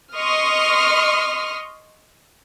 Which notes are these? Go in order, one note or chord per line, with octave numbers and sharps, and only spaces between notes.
D#5 C6 C#6 D#6 F6